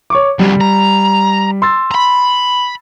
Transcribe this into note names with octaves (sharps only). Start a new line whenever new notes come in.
C#5 C#6 D6
D2 C3 G3
A#5
C6 E6 A6
A#5 B5